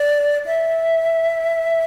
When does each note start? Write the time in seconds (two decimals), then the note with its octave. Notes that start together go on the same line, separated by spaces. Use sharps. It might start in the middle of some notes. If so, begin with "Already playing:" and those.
Already playing: D5
0.46 E5